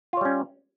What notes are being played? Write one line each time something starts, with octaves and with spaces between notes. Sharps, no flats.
G3 C#4 F4 C#5